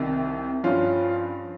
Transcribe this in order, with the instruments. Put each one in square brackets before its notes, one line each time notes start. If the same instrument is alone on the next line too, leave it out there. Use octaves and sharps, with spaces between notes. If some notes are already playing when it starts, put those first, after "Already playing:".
Already playing: [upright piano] C2 C3 D#3
G2 F3 C#4 F4